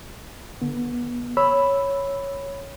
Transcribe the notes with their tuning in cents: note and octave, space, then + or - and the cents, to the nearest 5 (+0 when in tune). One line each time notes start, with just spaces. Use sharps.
D3 +0 B3 -30
C#5 +0 B5 +0 E6 +0